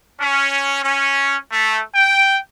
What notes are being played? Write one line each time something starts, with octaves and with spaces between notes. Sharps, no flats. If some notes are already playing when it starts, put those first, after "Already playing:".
C#4
C#4
A3
G5